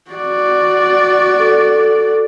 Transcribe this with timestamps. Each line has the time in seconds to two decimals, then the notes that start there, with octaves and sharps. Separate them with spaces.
0.11 F#4 D5
1.39 A4